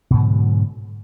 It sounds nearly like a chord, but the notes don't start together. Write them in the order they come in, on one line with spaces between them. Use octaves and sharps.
B2 G#2 D3 F#3